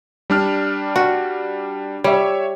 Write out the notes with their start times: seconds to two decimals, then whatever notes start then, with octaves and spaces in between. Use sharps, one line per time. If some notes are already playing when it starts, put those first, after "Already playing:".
0.30 G3 D4 F6
0.96 F#4
2.04 G3 C#5 E5